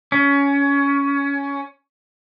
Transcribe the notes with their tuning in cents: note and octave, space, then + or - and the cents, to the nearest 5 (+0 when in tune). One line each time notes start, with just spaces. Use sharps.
C#4 +20